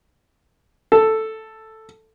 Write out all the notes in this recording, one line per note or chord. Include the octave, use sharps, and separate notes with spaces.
A4